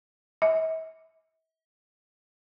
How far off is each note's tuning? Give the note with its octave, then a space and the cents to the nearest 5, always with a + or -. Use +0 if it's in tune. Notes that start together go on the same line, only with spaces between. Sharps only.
E5 -45